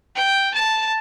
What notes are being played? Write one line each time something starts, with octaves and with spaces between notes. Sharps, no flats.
G5
A5